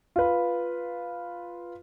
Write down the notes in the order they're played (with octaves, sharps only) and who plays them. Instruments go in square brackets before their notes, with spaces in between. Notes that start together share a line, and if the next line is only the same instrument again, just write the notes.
[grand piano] F4 B4